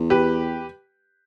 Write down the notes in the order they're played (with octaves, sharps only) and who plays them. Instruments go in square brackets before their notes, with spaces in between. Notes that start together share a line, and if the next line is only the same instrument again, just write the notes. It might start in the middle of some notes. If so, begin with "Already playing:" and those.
Already playing: [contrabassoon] E2
[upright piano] G4 B4